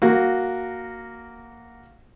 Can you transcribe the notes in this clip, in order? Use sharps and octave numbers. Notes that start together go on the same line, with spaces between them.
A#3 F#4